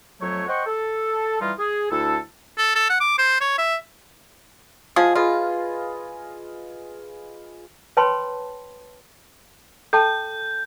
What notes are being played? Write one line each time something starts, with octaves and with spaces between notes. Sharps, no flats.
F2 F#3 A3 C#5
C5 D#5 F#5 G5 C#6
A4
E3 G3 D#4 F4
G#4
D2 E4 A4
A4
A4
F#5
D6
C5
C#5
E5
F3 F4 G#4 D#5
F4 G#4 B4 D#5
B4 C#5 G5 A5 B5 C6
A4 G5 A5 G6